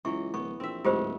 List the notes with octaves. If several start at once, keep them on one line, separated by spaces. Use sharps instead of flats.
C#2 E3 F#3 C#6
D1 B3 C#6
A#1 C4 E5
D1 G#2 B3 E4 F4 G4 C5